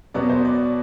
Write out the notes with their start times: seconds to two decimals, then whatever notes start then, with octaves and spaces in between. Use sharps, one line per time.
0.14 B2 F#3 B3 D5
0.30 C5
0.45 D5